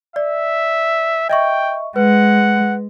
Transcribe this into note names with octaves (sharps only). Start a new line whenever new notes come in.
D5 E5
D#5 E5 G5 C#6
G#3 B4 F#5